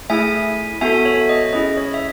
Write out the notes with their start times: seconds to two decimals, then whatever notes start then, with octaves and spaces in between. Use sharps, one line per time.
0.10 A3 E4 G#4 E5 G#5
0.81 B3 F#4 A4 E5 G#5
1.05 C#5 E5
1.29 D#5
1.53 C#4 E4 G#4 D#5
1.77 C#5
1.94 E5